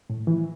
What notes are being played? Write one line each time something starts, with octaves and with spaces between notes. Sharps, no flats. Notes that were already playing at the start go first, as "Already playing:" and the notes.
A2
E3